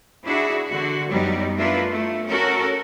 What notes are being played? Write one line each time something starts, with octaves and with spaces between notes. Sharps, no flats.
D4 E4 F#4 G#4
D3 F#4
F#2 F#3 G3 B3 D#4
A3 D4 E4 F4 A#4 B4
A3
C#4 F#4 A4 A#4